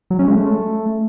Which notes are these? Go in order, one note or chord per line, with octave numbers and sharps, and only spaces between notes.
F#3
C#4
G#3
A3